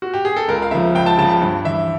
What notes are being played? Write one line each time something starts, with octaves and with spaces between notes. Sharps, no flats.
F#4
G4
G#4
A4
C#2 A#4
F5
C#3 F3 E5
C#2 G5
A5
C#3 F3 A5
A5
G2
E3 E5